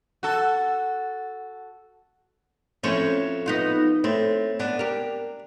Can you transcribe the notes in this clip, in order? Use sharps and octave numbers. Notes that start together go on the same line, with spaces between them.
F#4 A4
F2 A2 C#4 C5 C#5
B3 D#4 F4
A2 C4
B3 D4
G4 A#4